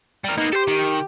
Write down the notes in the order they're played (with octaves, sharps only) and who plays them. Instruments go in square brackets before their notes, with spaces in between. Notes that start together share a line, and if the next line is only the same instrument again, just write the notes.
[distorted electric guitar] G3 A#4
[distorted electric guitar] A#3 B3 [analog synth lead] D#4
[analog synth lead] G4 [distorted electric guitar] A4 C5
[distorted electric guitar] D#3